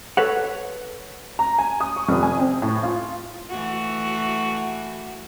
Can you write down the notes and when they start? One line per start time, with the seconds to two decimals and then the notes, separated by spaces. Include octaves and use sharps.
0.17 A4 B4 C#5 F#5
1.39 A#5
1.58 G#5
1.80 D#6
1.96 C#6
2.09 F1
2.23 G#5
2.39 C4
2.62 A2
2.83 F4
3.50 E3 A3 F#4